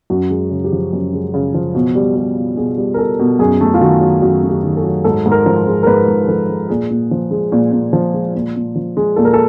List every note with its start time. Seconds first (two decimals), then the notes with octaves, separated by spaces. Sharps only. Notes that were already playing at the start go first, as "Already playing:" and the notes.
0.10 F#2 F#4
0.30 G#3
0.51 C#3
0.64 G4
0.72 F3
0.93 F#2
1.13 G#3
1.34 C#3
1.54 F3
1.75 B2
1.95 G3
2.16 G3
2.37 B2
2.57 B2 G#4
2.78 G3
2.94 A#4
2.98 G3 A4
3.19 B2
3.39 F#2 G#4
3.61 A3
3.74 F4
3.81 D#3 F#4
4.01 F#3
4.22 F#2 F#4
4.43 A3
4.49 G4
4.63 D#3
4.77 A4
4.84 F#3
5.04 G#2 A4
5.26 G#2
5.32 A#4
5.46 F3
5.67 G#3
5.83 A#4
5.87 G#2 B4
6.07 G#2
6.23 G#4
6.28 F3 A4
6.49 G#3
6.69 A#2 G#4
6.90 A#2
7.11 F3
7.31 G#3
7.52 A#2
7.72 A#2
7.93 F3
8.14 G#3
8.35 A#2
8.56 A#2
8.75 F3
8.97 G#3
9.16 A#2 A4
9.25 A#4
9.33 A4